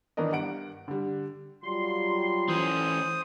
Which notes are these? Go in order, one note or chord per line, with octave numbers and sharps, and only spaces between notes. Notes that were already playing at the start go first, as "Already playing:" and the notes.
D#3 E3 B3 D4 A#4 D#5
G2 F#5 D7
D3 G3
F#3 G3 F4 C6
E3 C#4 C5 D#6